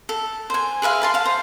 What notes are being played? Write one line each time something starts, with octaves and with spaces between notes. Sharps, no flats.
A4
C5 G#5
G#4 B4 E5 F5
B4 A5 C6
F5 A5
C5